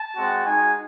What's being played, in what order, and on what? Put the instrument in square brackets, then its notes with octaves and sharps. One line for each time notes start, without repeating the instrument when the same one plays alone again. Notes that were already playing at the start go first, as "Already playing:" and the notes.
Already playing: [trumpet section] A5
G#3 C4 F#4
G#3 D#4 F#4 G#5